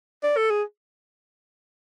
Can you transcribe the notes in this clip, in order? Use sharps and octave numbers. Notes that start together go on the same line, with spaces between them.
D5
A4
G#4